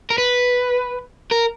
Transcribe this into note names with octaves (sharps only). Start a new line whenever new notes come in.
A#4
B4
A#4